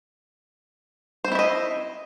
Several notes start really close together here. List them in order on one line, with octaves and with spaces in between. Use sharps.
C5 C4 E4 E5 D#5